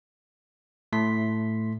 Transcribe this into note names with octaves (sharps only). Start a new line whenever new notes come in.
A2 A3 C6 B6